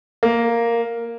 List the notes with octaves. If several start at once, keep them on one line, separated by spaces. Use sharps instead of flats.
A#3